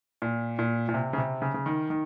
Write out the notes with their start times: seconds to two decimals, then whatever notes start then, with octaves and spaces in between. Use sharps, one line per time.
0.22 A#2
0.59 A#2
0.89 A#2
0.94 C3
1.13 C#3
1.18 C3
1.42 C#3
1.54 C#3
1.66 D#3
1.90 D#3